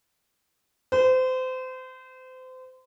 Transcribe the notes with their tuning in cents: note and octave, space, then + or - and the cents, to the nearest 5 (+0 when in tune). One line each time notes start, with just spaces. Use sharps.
C5 -30